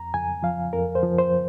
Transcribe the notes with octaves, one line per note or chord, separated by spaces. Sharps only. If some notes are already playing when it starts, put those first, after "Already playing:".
Already playing: F2 A#5
F2 G#5
F3 F5
F2 A#4
C5
F3
C5